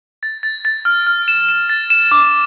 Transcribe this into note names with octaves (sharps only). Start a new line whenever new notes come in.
A6
A6
A6
F6
F6
E7
E7
A6
E7
D6